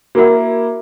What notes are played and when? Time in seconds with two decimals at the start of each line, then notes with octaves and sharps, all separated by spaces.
0.15 A#3 E4 F#4 A#4 F#5